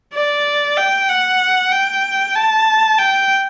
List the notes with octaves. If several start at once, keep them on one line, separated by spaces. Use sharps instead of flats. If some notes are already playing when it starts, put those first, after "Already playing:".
D5
G5
F#5
G5
A5
G5